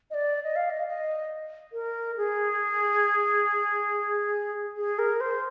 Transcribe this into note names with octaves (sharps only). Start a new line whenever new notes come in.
D#5
D5
D#5
F5
D#5
D#5
A#4
G#4
G#4
A#4
C5